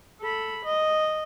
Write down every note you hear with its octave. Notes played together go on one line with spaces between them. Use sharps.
A4 B5
D#5